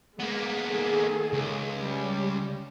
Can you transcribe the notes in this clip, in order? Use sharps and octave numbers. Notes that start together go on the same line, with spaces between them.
G#3 A#3 B3
D#3 G#4 A4
C#2
G3 C#4